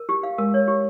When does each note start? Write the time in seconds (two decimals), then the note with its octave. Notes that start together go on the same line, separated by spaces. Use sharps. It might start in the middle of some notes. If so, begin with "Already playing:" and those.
Already playing: A#4
0.09 G4
0.23 F5
0.38 G#3 A#4
0.54 C#5
0.68 G4